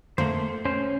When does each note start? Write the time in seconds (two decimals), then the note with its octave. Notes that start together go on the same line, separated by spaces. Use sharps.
0.18 F2 D3 A3 A#3 C5
0.65 C#4 C5